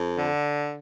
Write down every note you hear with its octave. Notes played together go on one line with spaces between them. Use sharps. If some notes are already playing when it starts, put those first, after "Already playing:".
Already playing: F2
D3